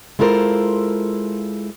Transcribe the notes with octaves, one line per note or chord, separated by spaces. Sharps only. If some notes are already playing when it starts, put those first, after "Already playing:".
G#3 E4 F4 A4 A#4 C5